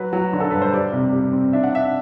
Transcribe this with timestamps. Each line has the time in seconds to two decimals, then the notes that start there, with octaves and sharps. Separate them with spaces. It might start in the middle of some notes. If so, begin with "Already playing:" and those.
Already playing: F#3 B4
0.13 F#3
0.33 D3
0.40 A4
0.51 G2 B4
0.62 C5
0.73 G3 D5
0.93 C3
1.13 G3
1.33 C4
1.53 D4 E5
1.64 F#5
1.73 D4 E5